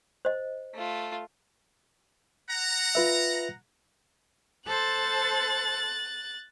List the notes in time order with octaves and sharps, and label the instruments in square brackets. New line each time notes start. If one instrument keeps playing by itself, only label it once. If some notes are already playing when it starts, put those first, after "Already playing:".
[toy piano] C5 D#5
[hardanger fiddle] A3 F4
[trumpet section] F#5 A#5
[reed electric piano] F4 B4 E5
[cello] A4 C5 [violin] F#6 A6